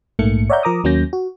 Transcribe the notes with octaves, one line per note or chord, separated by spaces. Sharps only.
A#1 G#2 A3 A#3 C#7
C#5 D5 E5 F#5 A#5 G6
F3 A#4 A#5 D6 D#6
D#2 F#3 A#3 C#4 G6 A#6
F#4